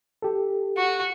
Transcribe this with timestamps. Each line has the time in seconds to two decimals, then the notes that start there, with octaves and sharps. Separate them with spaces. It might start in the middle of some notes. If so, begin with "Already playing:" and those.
0.22 G4 A4
0.77 F#4